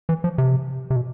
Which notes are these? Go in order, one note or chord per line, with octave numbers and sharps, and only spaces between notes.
E3
F3
C3
C3
B2